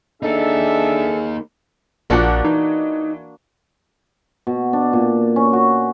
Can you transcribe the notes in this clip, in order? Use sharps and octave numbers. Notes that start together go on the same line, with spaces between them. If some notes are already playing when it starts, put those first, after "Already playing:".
A#3 D4 D#4 G#4 A4 E5
A#1 A#2 F3 A#3 D4 F#4 F#5
E3 D#4
B2
D4
A#2
C#4
F#4